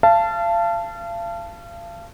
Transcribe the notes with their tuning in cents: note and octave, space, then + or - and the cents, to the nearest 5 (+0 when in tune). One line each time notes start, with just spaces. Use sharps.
F5 -35 A5 +0